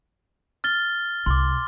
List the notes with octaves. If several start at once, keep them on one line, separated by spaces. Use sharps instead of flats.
F6 A6 G7
C2 C6 D6